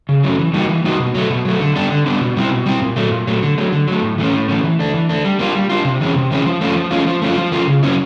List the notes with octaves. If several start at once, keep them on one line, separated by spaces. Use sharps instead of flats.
C#3
F#3 A3 C#4
E3
G3 A#3 D#4 F#4
E3
G3 A#3 D#4 F#4
B2
F#3 A3
B2
F#3 A3
D3
G3 B3 D4
D3
G3 B3 D4
B2
G3 C4 E4
B2
G3 C4 E4
A#2
F#3 A3
A#2
F#3 A3
D3
F#3 A3
D3
F#3 A3
A2
E3 A3 C#4
A2
E3 A3 C#4
E3
A3 D4
E3
A3 D4
G3
A#3 D4 F4
G3
A#3 D4 F4
C3
E3 G#3 C#4
C3
E3 G#3 C#4
F3
A3 C#4 F4
F3
A3 C#4 F4
F3
A3 C#4 F4
F3
A3 C#4 F4
C#3
F#3 A#3 C#4 E4